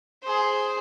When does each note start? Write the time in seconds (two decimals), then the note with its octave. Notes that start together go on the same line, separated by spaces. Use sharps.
0.23 G#4 C5